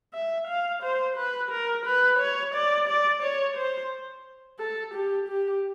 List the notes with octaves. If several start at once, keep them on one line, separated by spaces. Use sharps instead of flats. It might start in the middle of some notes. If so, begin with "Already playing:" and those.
E5
F5
C5
B4
A#4
B4
C#5
D5
D5
C#5
C5
A4
G4
G4